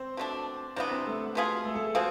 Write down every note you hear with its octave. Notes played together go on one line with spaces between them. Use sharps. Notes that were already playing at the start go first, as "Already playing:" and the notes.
Already playing: C4 C5
B2 A3 D4
C3 E3 B3 D4 D5
C4 C5
A3 A4
B2 B3 F4 G#4
A3 A4
A3 A4
G#4
B2 G#3 C4 F4 G#4